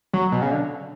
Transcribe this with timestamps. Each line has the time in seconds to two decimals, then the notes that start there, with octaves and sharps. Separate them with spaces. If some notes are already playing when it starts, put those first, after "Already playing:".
0.13 F#3
0.32 B2
0.42 C#3
0.51 D3